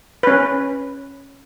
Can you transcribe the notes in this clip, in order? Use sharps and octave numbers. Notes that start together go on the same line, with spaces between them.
C#4 B4